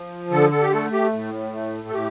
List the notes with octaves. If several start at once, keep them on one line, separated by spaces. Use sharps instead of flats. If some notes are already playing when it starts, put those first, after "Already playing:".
Already playing: F3
D3 A4
A4
G4
A3 A4
G4
A2
A3
A4
A2 G4